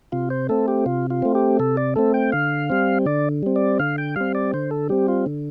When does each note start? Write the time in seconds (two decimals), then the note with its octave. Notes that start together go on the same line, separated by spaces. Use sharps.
0.12 C3 F4
0.30 C5
0.49 A3 C4 A4
0.68 G4
0.86 C3 F4
1.10 F4
1.22 A3 C4
1.35 G4
1.59 C3 A4
1.77 D5
1.96 A3 C4 A4
2.14 G5
2.32 D3 F5
2.70 G3 C4
3.06 D3 D5
3.43 G3 C4
3.56 D5
3.79 D3 F5
3.98 G5
4.16 G3 C4 F5
4.35 D5
4.54 D3 C5
4.71 A4
4.89 G3 C4 G4
5.08 F4
5.26 D3